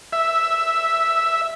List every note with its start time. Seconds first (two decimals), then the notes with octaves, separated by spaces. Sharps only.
0.13 E5